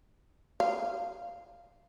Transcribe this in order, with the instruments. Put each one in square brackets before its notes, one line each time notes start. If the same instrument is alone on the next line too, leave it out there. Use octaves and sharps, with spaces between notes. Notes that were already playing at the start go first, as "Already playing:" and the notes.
[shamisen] F5